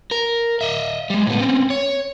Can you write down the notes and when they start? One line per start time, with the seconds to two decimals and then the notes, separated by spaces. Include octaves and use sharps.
0.11 A#4
0.61 D#5 E5
1.10 G3 G#3
1.27 A2 B3
1.40 C4 C#4
1.70 C#5